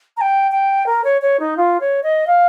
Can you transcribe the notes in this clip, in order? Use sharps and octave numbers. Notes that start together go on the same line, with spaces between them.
A#5
G5
G5
A#4
C#5
C#5
D#4
F4
C#5
D#5
F5